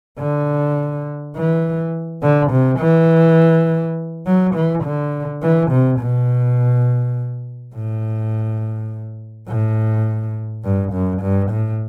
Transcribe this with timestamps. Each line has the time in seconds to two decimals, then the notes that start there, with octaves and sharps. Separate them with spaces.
0.19 D3
1.36 E3
2.22 D3
2.51 C3
2.80 E3
4.26 F#3
4.54 E3
4.84 D3
5.42 E3
5.71 C3
6.00 B2
7.74 A2
9.48 A2
10.64 G2
10.92 F#2
11.22 G2
11.51 A2